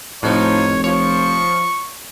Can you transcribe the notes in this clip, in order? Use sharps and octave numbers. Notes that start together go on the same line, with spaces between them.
F1 A2 F3 D#4 C#5
F3 C#5 C#6